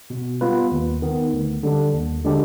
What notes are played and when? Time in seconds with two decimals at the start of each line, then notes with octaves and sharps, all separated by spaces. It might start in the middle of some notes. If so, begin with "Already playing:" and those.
0.10 B2
0.41 G3 B3 F4 B4
0.72 D#2
1.02 D#3 B3
1.33 D2
1.63 D3 G3 D4
1.93 D#2
2.24 D3 G#3 D4 G4